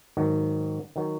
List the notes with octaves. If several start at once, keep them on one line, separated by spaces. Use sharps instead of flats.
G#2 D#3 F#3
D#3 F#3